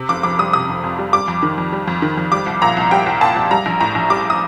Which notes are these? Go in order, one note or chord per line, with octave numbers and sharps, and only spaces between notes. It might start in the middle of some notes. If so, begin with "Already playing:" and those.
Already playing: C3
F1 D6
F2 D6
G3 D#6
C3 D#6
F1
F2
G3
G3 D6
F2
D#3
F2
G3
F2
D#3
F2
G3 D6
C2
A#2 A#5
C2
G3 G5
C2
A#2 A5
C2
G3 A#5
A#1
A2 A#5
A#1
G3 D6
D#6